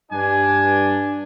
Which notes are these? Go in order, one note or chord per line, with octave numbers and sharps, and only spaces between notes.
G2 D4 G#5